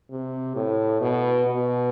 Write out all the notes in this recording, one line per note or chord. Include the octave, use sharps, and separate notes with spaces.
C3
A2
B2
B2